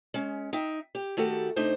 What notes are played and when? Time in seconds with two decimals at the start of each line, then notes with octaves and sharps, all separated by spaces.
0.14 G#3 C#4
0.53 D#4 E5 G5
0.95 G4
1.17 D#3 A3 F#4 G4 A4
1.56 C3 A3 D4 D#4 C5